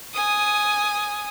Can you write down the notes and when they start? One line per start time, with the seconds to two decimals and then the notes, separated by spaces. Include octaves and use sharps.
0.13 G#5 D#6